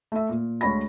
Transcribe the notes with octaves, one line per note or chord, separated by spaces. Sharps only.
A3 E5
A#2
D2 G#3 C#5 B5 A#6